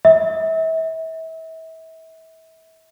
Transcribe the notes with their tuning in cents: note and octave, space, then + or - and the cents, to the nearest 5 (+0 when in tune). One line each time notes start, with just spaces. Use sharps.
E5 -35